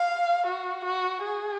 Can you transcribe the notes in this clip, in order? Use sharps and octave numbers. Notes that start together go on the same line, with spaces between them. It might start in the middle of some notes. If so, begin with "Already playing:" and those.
Already playing: F5
F#4
F#4
G#4